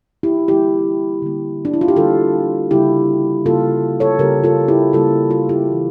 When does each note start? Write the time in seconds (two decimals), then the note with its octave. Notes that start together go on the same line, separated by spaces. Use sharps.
0.23 E4 G4
0.48 D3 G3 A#3 E4 G4
1.22 D3 G3 A#3
1.65 D4
1.74 E4
1.81 F4
1.88 G4
1.96 D3 G3 A#3 F4 A4
2.71 C#3 G3 A#3 E4 G4
3.45 C#3 G3 A#3 F4 A4
4.00 A4 C#5
4.19 C#3 G3 A#3 G4 A#4
4.44 F4 A4
4.68 E4 G4
4.93 C#3 G3 A#3 F4 A4
5.30 F4 A4
5.49 E4 G4
5.67 E3 G3 A#3